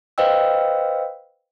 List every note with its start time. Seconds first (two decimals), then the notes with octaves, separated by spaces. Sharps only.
0.18 B4 C5 D#5 F5 G5 E6